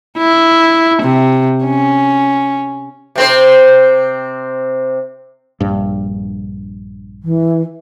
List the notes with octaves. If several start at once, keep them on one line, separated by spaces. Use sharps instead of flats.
E4
C3
C#4
C3 C4 C5
A#1 G2
E3